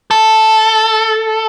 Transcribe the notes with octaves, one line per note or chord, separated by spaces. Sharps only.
A4